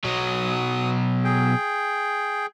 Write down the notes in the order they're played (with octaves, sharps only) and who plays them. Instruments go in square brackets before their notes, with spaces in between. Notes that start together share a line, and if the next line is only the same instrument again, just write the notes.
[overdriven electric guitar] B2 F#3 [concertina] D#6
[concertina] G#4 G5